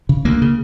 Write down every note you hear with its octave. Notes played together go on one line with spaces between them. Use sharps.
C#3
D2 A#3
C#3